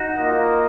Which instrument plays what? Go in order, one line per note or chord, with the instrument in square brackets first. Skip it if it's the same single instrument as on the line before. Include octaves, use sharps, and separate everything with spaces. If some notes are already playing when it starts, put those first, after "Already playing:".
Already playing: [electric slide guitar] D#4 F#4
[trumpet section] A#3 F4 A#4 D#5